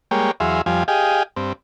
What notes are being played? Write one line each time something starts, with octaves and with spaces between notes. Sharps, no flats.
G3 G#3 A#3 C#5 G5
E2 F#3 G#4 E5 F5 C6
F2 F3 G3 F5 G#5
G4 G#4 D#5 F5 G5 G#5
G2 C4